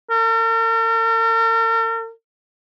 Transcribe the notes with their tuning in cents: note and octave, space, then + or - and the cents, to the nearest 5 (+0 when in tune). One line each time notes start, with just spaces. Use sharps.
A#4 -45